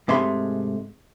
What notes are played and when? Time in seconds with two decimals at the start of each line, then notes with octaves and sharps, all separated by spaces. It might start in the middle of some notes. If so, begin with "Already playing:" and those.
0.08 G#2 C3 G#3 A3 C6